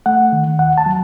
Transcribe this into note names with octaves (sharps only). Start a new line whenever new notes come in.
A3 F#5
D#3
D#2 F#5
A5
F#3